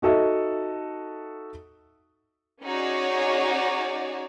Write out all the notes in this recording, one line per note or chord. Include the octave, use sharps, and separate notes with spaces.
D#4 F#4 A4 D#5 E5
C#4 D#4 F#4 G#4 C#5 D5